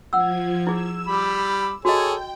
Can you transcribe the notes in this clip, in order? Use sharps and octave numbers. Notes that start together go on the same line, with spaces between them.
F3 F#5 E6 G#6
E4 G#4 E6
G3 B5 D6
F#4 G#4 A4 C#5 D#5 G5